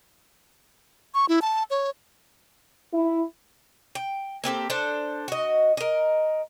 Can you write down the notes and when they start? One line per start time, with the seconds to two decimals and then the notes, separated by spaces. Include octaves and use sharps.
1.14 C#6
1.29 E4
1.42 A5
1.70 C#5
2.92 E4
3.95 G5
4.44 A#3 C4 G4 A4
4.70 D4 A4 C5
5.28 F#4 D#5
5.77 A#4 D#5